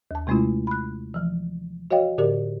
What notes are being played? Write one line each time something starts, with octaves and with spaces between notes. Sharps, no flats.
D#2 A5
C3 G#3 A3 C#4 E4 F4
B5 F#6
E3 F3
F#4 C#5 D#5 F5 G5
A2 D3 G4 A#4 D5